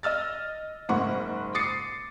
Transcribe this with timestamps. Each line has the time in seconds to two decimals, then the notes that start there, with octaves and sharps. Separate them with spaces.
0.03 D#5 E6 F6 A6
0.89 F#1 G#2 A#3 F#5 B5 C#6
1.54 D6 D#6 A6 C7 C#7